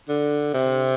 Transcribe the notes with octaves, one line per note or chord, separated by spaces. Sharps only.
D3
C3